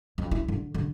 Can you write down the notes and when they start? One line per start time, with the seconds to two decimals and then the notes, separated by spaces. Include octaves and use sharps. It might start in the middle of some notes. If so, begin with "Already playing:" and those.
0.18 F2
0.31 E4
0.48 D3
0.74 D3